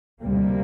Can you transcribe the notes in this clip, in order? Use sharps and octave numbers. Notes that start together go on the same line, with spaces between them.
D2 C3 G3 A#3